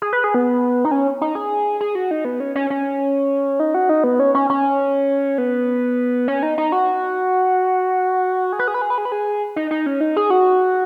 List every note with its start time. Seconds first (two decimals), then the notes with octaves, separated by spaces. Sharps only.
0.02 G#4
0.13 B4
0.24 G#4
0.34 B3
0.85 D#4
0.91 C#4
1.21 D#4
1.35 G#4
1.81 G#4
1.95 F#4
2.11 D#4
2.25 B3
2.40 C#4
2.56 C#4
2.70 C#4
3.60 D#4
3.75 F#4
3.89 D#4
4.04 B3
4.20 C#4
4.35 C#4
4.50 C#4
5.38 B3
6.28 C#4
6.43 D#4
6.58 D#4
6.72 F#4
8.53 G#4
8.59 B4
8.68 G#4
8.74 B4
8.82 G#4
8.90 B4
8.98 G#4
9.05 B4
9.12 G#4
9.56 D#4
9.71 D#4
9.86 C#4
10.01 D#4
10.17 G#4
10.30 F#4